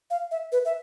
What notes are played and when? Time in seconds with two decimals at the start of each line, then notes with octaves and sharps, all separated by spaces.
0.10 F5
0.31 E5
0.52 B4
0.65 E5